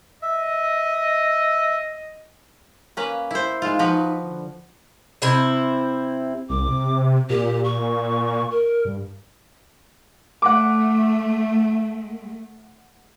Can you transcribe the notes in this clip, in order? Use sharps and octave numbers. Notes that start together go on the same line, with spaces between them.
D#5 E5
A#3 C#4 B4
E4 C5
G#3 D#4 F4
F3 F#4 B4
D3
C3 C4 E4
C2 D6
C3
A#2 G4
C#6
A#4
G2
A3 F#5 D6